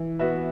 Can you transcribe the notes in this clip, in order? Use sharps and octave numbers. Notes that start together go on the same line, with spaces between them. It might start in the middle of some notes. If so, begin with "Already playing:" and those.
Already playing: E3
B3 F#4 B4 E5